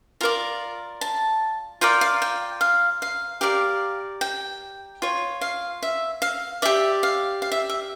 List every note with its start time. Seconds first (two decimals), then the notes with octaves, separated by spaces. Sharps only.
0.21 F4 A#4 D5 A#5
1.01 A5
1.81 F4 A#4 D5 G5
2.01 F5
2.22 G5
2.61 F5
3.02 F5
3.41 G4 A#4 D5 F5
4.21 G5
5.02 F4 C#5
5.41 F5
5.83 E5
6.22 F5
6.62 G4 D5 E5
7.03 F5
7.42 F5
7.52 E5
7.70 E5